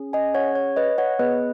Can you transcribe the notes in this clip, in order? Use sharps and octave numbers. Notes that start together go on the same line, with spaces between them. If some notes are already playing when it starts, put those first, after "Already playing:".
Already playing: C#4 G#4
D#5 G#5
C#5 F#5
C#5
B4 D#5
C#5 F#5
B3 G#4 B4 D#5